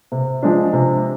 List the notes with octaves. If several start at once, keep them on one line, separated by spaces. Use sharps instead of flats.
C3
F3 G#3 D4
C3